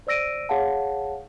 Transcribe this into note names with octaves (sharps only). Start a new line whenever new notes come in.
C5 D5 E6 A#6 D7 D#7
G#4 C#5 F5 F#5 A5